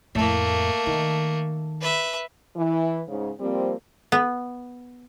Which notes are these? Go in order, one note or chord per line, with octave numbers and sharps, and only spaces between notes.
F2 A2 A3 A#3
D#3
B4 E5
E3
G#2 C#3
F3 G3 A#3 C4
B3